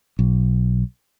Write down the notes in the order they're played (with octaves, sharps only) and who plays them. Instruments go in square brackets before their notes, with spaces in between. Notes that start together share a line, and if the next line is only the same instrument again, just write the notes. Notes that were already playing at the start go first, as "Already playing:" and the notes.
[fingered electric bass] B1